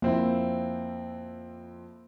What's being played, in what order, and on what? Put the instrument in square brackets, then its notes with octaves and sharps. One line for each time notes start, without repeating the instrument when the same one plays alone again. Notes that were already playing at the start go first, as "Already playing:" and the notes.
[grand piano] F2 C4 E4 [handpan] A#3